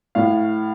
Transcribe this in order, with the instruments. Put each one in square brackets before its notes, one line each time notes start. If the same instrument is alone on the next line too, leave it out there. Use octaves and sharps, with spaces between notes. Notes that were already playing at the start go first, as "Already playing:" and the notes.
[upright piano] A2 F5